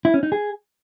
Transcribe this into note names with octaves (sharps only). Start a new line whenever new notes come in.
E4
C#4
D#4
G#4